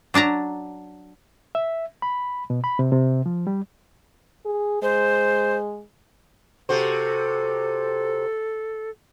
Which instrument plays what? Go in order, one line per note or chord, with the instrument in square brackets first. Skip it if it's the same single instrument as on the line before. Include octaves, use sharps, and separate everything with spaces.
[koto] F#3 D4 A5 A#5
[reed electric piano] E5
B5
B2
B5
C3
C3
F3
G3
[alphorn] G#4
[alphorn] G#3 [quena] C5
[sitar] C3 F#4 C5 [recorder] A4